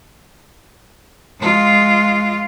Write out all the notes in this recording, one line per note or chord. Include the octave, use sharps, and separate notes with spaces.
G#3 F4